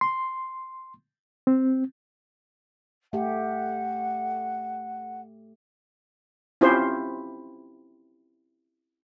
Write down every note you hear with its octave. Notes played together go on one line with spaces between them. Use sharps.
C6
C4
A3 G4 F#5
C4 C#4 E4 F4 G4 C5